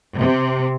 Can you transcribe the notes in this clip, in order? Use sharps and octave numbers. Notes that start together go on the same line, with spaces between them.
C3